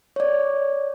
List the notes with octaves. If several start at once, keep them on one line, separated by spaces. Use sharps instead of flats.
C#5 D5